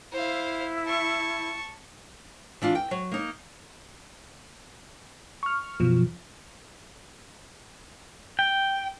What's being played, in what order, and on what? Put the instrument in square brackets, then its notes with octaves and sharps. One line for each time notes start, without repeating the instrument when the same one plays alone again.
[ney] E4 [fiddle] C5 F5
[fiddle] A5 C#6
[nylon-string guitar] E3 D4 F4
G5
F#3
A#3 D#4
[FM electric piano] C#6 F6
F#2 B2 F3
[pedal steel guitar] G5